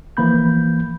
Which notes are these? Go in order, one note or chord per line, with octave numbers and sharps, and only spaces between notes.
E3 F3 A#3 B5 G6